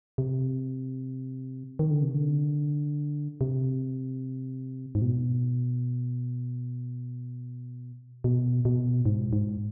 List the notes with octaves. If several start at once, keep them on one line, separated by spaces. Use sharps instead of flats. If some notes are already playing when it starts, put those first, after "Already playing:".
C3
D#3
D3
C3
D3
C3
G#2
B2
B2
B2
G#2
G#2